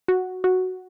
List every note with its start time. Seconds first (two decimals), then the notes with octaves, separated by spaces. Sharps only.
0.08 F#4
0.44 F#4